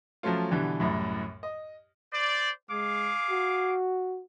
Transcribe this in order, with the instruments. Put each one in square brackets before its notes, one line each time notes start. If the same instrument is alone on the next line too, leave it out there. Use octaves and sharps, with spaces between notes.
[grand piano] F3 F#3 A3 C#4 F4
B2 D3 E3 G3
C2 F#2 A2
D#5
[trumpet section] C5 D5
[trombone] G#3 [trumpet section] G#4 F5 D6
[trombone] F#4